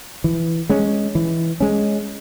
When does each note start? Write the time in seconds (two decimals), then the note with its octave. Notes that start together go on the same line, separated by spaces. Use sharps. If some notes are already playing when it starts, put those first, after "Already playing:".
0.24 E3
0.70 G#3 C#4
1.15 E3
1.60 G#3 C#4